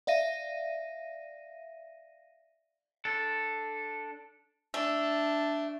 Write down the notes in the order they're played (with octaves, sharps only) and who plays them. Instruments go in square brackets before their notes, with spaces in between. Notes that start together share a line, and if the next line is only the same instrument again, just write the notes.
[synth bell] D5 E5 F5 A#6 D#7
[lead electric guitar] D4 A4
[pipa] A3 [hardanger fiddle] D4